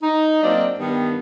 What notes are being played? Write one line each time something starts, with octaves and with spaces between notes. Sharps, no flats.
D#4
F#3 A#3 C4 D4 D5 D#5
G2 D#3 G3 B3